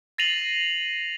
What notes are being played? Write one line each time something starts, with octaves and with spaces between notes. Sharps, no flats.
A6 A#6 C7 D#7 F7 F#7